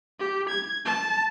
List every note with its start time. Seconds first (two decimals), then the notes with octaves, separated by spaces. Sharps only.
0.20 G4
0.50 G#6
0.86 A5